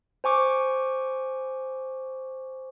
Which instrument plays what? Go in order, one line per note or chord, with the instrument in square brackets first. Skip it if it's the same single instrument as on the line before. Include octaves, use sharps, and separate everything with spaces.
[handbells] C5 G#5 C#6 D6